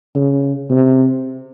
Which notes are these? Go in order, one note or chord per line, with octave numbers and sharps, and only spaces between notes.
C#3
C3